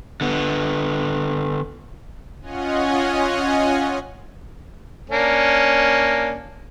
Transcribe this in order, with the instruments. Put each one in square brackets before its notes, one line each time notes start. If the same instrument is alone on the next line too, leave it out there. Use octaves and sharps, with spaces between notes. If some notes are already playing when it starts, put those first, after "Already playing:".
[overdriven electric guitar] D3 B3
[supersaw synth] C#4 F4 C#5 D#5 F#5 G#5
[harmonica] A#3 C#4 D4